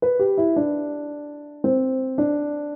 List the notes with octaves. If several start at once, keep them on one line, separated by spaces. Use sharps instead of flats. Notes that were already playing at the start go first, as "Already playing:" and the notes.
B4
G4
E4
D4
C4
D4